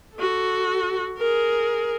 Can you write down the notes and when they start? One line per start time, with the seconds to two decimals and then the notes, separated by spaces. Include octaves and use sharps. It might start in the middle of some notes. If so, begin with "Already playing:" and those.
0.16 F#4 A4
1.18 G#4 A#4